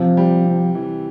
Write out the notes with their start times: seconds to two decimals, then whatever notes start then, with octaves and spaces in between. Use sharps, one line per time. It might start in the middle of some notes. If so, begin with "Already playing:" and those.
Already playing: C3 F3
0.17 G3
0.46 C3
0.75 E3